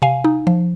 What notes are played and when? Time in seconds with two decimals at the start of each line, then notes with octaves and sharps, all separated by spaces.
0.02 C3 F5 G#5
0.24 D#4
0.47 F3